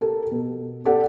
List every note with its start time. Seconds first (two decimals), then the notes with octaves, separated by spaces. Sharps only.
0.01 G4 A4 A#4
0.31 B2
0.85 G4 A4 D5 F#5